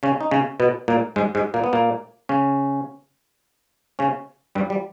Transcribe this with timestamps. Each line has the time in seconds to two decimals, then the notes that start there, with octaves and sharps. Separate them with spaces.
0.03 C#3 C#4
0.21 D#4
0.31 C#3 C#4
0.60 B2 B3
0.88 A#2 A#3
1.16 G#2 G#3
1.35 G#2 G#3
1.54 A#2 A#3
1.64 B3
1.73 A#2 A#3
2.29 C#3 C#4
3.99 C#3 C#4
4.55 G2 G3
4.70 G3